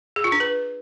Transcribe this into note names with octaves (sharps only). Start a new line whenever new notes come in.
G#4
F4
D4
B4